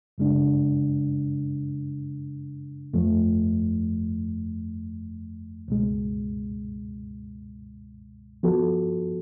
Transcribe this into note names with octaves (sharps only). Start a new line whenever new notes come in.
F#2 C#3 G#3 D4
F2 F3 A3
C#2 B2 G#3
F3 B3 F#4 A4